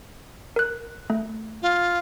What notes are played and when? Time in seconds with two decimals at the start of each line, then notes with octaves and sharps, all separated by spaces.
0.56 A#4 F#6
1.10 A3
1.62 F4